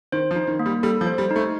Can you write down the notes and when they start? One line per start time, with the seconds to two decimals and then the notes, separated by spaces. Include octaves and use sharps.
0.12 D#3 C5
0.31 F3
0.36 D#4
0.47 D#3
0.59 A#3
0.66 G3
0.83 G3 A4
1.01 F3
1.07 C5
1.18 G3
1.31 D#4
1.36 A3